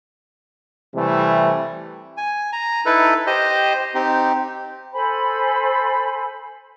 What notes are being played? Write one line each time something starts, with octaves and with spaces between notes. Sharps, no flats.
C3 E3 G3 A3
G#5
A#5
D#4 E4 A4 B4
G4 C5 D#5
C4 D#4 G4
A4 C5 G#5 B5